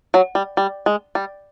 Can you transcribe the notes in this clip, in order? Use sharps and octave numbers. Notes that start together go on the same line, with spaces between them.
F#3
G3
G3
G#3
G3